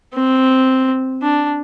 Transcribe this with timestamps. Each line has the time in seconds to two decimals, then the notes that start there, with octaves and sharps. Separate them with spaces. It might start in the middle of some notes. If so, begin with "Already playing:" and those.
0.14 C4
1.22 D4